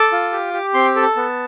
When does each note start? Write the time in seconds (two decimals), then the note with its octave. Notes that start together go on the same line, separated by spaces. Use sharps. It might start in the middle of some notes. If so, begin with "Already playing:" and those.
Already playing: A4 D6
0.12 F4
0.32 G4
0.53 G4
0.74 C4 C6
0.96 A4
1.03 A5
1.17 B3